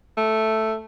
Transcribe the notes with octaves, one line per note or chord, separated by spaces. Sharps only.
A3